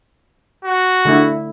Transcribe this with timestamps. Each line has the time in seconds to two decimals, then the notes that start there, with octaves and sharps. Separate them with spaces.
0.65 F#4
1.05 D3 A3 E4